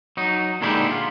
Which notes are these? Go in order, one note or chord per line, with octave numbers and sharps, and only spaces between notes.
F#3 D#4
A#2 D3 G#3 D#4 E4 G4
F4